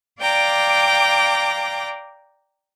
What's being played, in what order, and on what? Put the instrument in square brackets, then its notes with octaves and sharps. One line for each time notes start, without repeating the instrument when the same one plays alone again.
[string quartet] D5 F5 G5 A#5 D6